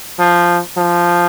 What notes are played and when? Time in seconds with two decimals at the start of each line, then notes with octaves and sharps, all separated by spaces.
0.19 F3
0.77 F3